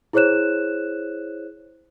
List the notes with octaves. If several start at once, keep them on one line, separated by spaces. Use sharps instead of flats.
E4 G#4 C5 C#5 F#6 E7